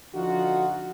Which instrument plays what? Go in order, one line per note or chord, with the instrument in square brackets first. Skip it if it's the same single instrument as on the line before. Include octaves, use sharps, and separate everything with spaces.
[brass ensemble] D3 F3 D#4 F4 F#4